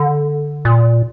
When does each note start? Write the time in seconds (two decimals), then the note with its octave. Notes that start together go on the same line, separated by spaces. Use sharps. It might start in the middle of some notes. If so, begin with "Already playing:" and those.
Already playing: D3
0.65 A#2